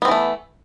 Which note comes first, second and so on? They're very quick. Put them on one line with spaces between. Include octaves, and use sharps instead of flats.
B3 C4 E3 A3